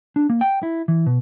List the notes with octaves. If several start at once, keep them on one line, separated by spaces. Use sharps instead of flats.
D4
A#3
G5
E4
E3
B2